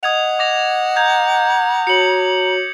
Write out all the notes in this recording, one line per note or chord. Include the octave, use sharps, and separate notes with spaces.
D#5 F#5 D#6 G#6 F7
D6 A#6 F7
A#5 G6 G#6 F7
F#4 C#5 C#7 F#7